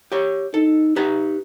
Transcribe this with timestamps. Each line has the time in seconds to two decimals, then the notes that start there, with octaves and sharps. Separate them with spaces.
0.12 G4 C#5
0.54 D#4 A4
0.96 D#4 G4 B4 A#5